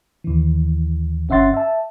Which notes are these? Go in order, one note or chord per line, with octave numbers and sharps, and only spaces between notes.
D#2 E3
G1 C#4 E5 F#5 C6 A6
E5 A5